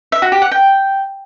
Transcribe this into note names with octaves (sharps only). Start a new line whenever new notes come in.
E5
F#4
G4
F#5
G5